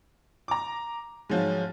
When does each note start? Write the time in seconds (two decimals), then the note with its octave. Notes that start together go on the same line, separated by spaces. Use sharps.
0.48 A#5 D6
1.30 G#2 F3 F#3 G#3 F4